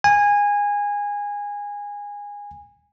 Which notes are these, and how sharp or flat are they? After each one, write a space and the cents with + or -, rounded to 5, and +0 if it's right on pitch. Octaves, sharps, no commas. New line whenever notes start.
G#5 -20